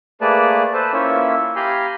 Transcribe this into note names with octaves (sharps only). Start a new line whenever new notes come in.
A3 A#3 G#4 B4 D5 A5
A4 B4 C5 A5
A#3 C#4 E4 F4 C#5 E5
G4 F5 G#5 A#5 B5 G6